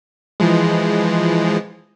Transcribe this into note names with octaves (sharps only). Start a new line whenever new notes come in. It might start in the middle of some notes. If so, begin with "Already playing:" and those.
E3 F3 G#3